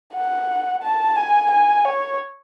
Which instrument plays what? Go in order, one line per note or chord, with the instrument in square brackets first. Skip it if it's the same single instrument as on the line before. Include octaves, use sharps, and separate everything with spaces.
[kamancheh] F#5
A5
G#5
G#5
C#5